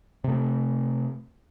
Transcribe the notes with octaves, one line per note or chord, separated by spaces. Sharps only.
C3 A3